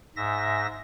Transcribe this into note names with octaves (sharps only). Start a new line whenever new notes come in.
G#2 E5 A#6